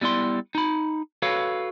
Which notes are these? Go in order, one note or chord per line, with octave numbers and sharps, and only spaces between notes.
G3 B3 E4 D5 C6
D#4 B5
F#4 A4 B4 C#5 F5